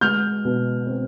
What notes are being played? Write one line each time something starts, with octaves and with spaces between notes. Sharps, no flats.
G#3 F6 G6
B2
C4